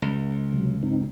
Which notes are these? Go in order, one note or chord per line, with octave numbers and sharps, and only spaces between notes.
C#2
C3 F#3
G2 C4 D#4